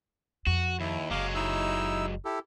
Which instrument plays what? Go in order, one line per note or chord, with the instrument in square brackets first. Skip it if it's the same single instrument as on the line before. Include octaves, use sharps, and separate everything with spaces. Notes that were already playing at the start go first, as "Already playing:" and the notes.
[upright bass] F2 [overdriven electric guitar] F#4
[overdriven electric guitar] D#2 [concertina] E4
[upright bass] F#1 [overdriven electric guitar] F#3 G#3 [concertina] F5 D6
[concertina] D#4 E4 E6
E4 G4 A4